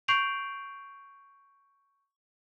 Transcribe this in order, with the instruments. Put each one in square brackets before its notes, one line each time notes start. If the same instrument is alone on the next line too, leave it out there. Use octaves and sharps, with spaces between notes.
[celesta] C#6 G6 C7 D7 F7 F#7